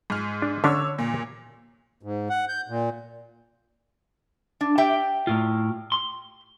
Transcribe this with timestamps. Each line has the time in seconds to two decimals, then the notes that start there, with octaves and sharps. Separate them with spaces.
0.10 G#2 F6
0.42 D4
0.64 D3 C#4 D4 C#5 E6
0.99 A#2
2.03 G#2
2.30 F#5
2.49 G6
2.68 A#2
4.61 D4
4.78 G4 E5 G5
5.27 A2 F4
5.92 C6